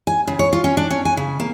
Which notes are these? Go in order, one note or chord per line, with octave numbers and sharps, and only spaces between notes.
G#5
C#3
C#5
F4
C#4
D4
C#4
G#5
C#3
A#3